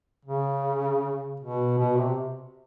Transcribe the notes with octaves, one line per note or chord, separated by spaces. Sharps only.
C#3
B2
B2
C3